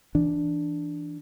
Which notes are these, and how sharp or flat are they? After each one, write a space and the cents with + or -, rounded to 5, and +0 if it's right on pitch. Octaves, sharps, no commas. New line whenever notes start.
E3 +0 D4 +0